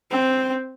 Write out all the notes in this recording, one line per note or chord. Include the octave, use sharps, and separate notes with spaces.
C4